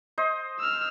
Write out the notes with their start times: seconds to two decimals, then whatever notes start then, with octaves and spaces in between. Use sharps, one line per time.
0.18 C5 D#5
0.60 E6 F6